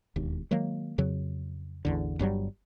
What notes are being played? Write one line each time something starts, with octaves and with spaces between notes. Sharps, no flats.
E1 D#2
D#3 F#3 G#3 A#3
F2 C#3 F#3
A1 E2 D3
G1 G2 F#3 G3